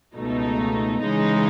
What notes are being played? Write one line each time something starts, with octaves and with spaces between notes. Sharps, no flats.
C#2 B2 A3 D#4
C#3 E3 G#3 D#4